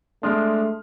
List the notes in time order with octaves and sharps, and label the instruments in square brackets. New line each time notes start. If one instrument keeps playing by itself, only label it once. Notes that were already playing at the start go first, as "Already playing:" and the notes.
[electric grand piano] G#3 D4 [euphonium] A3 [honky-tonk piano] C6 D#6 F6